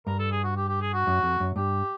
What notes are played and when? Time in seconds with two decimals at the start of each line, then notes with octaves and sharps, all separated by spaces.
0.07 G2 A#4
0.19 A4
0.31 G#4
0.44 F#4
0.56 G4
0.69 G4
0.81 G#4
0.94 F#4
1.07 F#2
1.23 F2
1.40 F#2
1.56 G2 G4